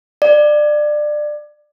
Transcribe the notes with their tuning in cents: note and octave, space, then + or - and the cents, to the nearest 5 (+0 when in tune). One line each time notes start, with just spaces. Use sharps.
D5 +25